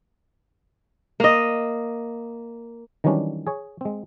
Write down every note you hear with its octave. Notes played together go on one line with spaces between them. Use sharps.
A#3 D#5
D#3 E3 F#3 G3 C#4 D4
G#4 C#5
G#3 C4